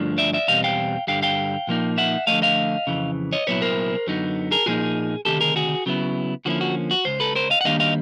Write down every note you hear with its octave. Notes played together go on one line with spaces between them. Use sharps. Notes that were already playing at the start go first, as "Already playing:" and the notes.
Already playing: G2 D3 F3 A3 D4
D5 E5
D5 E5
E2 B2 G3 C4 D#5 F5
F5 G5
G2 D3 G3 F5 G5
F5 G5
A#2 F3 A#3 D#4
E5 F#5
D3 F3 A3 D#5 F5
D#5 F5
F2 C#3 E3
C#5 D#5
C2 A#2 F#3 B3 E4 B4 C#5
A#4 C5
F#2 D3 F#3 B3 D#4
G#4 A#4
A#2 F3 A#3 D#4 F#4 G#4
D2 C3 D#3 G4 A4
G#4 A#4
F#4 G#4
C#3 F#3 B3 E4
D3 F3 A#3 C#4 E4 F#4
F#4
F#4
C#2 C#3 C5
A4 B4
A#4 C5
D#5 F5
F#5
D#2 D#3 G3 A#3 D4 D#5 F5
D#5 F5